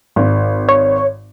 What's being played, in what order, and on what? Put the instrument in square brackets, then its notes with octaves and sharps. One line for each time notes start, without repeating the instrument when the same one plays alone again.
[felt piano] G#1
[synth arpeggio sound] C#5